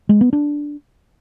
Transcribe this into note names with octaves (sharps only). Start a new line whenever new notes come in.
G#3
B3
D4